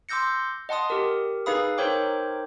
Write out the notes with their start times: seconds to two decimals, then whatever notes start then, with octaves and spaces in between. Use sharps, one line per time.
0.09 C6 D6 E6 G6 A#6 C#7
0.69 D#5 F#5 A5 C6 D#6
0.90 G4 A#4
1.46 D#4 G#4 B4 F5 B5 D#6
1.78 D#4 A#4 C5 C#5 G5 D6